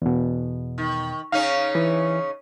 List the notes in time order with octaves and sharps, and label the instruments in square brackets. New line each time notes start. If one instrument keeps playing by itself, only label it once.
[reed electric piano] E2 B2
[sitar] D#3
[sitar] C#3 C#4 D#4 [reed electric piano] F5
[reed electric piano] E3